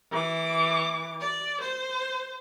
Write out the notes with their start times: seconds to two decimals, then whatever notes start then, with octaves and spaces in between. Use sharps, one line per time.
0.11 E3 D6
1.21 D5
1.62 C5